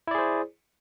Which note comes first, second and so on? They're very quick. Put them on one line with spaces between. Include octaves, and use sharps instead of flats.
E4 D5 G#4 C5